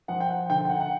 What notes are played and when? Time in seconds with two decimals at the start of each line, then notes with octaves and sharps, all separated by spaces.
0.08 F3 F#5
0.20 G5
0.29 F#5
0.50 D3 G5
0.65 G5
0.69 F#5
0.80 F#5